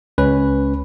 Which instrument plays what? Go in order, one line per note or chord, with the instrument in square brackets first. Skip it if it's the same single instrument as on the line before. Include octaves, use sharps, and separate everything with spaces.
[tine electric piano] C#2 C#4 B4